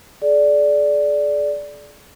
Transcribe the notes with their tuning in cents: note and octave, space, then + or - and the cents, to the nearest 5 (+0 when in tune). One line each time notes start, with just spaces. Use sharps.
G#4 +40 D5 -5